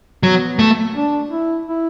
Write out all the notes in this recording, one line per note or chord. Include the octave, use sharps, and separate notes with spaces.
F#3 B3
A3
D4
E4
E4